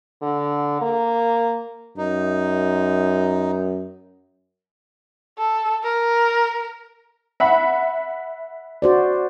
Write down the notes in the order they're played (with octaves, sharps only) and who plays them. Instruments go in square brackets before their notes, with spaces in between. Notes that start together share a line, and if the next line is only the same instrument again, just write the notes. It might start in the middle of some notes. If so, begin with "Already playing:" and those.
[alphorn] D3
A#3
[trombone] F#2 [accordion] D#4
[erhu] A4
A#4
[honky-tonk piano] E5 F#5 B5
[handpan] F#4 C5 D5